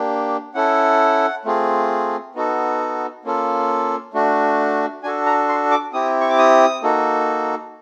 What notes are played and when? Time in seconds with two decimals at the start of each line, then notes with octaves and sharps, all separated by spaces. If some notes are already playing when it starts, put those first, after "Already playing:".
Already playing: A#3 D4 G4
0.54 C#4 E4 A4 F#5
1.45 A3 C4 F4 G#4
2.35 B3 D#4 F#4 A4
3.25 A#3 C#4 F4 A4
4.14 A3 D4 F#4
5.03 D4 F#4 A4 G#5
5.26 A#5
5.48 C6
5.71 D6
5.93 C4 E4 G4 D#6
6.21 C#6
6.29 D6
6.38 D#6
6.83 A#3 D#4 F#4 A4